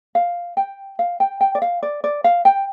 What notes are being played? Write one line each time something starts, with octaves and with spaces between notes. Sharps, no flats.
F5
G5
F5
G5
G5
D5
F5
D5
D5
F5
G5